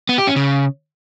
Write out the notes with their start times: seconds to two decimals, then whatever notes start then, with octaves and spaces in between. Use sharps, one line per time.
0.09 B3
0.18 G4
0.27 C#4
0.36 C#3